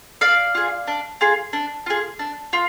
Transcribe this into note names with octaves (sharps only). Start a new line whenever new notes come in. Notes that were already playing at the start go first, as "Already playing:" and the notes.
D4 D5 F5
F4 G#4
D4
F4 G#4
D4
F4 G#4
D4
F4